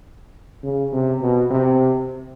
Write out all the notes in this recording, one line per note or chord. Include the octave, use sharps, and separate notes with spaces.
C#3
C3
B2
C3